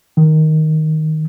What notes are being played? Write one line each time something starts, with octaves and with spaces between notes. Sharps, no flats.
D#3